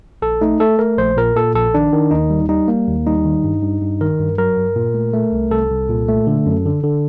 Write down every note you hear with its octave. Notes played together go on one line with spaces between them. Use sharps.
A#1 A4
A3 D#4
A3 A4
A3 A#4
A#1 C5
A#2 A#4
A#2 A4
A#1 A4
D#3 D4
D#3
D#2 D#4
G3
G3 D#4
A#3
D#2
G3 D#4
D#3
G2
G2
G2
D#3 A#4
G2
F#3 A#4
G2
A#2
A3
A3
C2
C2 A4
C2
A#2
A3
D3
F#2
D3
D3